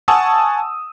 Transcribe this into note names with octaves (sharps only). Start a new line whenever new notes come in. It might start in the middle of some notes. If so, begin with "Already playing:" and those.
F#5 G#5 A5 C#6 D#6 E6